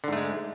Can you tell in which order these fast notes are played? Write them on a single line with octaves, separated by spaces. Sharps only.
D3 G#2 A3 G#3